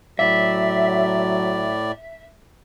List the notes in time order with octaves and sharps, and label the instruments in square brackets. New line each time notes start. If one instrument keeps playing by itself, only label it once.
[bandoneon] A2 D5 [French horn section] F#3 [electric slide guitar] E5